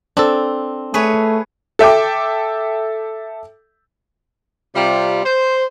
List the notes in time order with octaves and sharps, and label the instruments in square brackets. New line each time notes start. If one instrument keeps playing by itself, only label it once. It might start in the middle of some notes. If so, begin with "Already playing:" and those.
[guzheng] C4 [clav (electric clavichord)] D4 A4
[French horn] A3 [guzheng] G#4 B4 C#5
[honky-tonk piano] A4 E5 G5 D6
[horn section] C3 G3 F4
C5